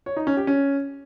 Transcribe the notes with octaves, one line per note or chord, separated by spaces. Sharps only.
C#5
D#4
C#4
G4
C#4